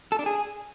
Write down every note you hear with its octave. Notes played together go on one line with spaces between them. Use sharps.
A4
D4
G#4